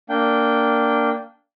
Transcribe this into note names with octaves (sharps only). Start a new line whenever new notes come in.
A#3 D4 G5